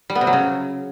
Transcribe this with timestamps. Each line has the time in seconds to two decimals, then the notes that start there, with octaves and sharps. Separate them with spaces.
0.10 G3
0.15 B3
0.21 C3
0.27 F#3
0.33 C#3